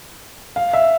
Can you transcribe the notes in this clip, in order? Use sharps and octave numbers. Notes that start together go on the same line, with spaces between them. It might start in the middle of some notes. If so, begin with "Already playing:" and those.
F5
E5